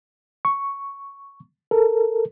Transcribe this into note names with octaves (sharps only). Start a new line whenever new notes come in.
C#6
A4 A#4